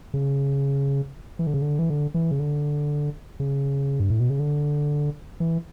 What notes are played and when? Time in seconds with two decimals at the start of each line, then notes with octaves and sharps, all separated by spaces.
0.14 C#3
1.39 E3
1.47 D3
1.54 C#3
1.62 D3
1.79 E3
1.89 D3
2.14 E3
2.31 C#3
2.39 D3
3.40 C#3
4.00 G2
4.10 A2
4.20 B2
4.30 C#3
4.39 D3
5.40 E3